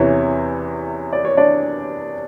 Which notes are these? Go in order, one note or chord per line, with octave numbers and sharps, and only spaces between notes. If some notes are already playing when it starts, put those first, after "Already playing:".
Already playing: E2 C3 E3 C#4 C#5
D5
C#5
D4 D5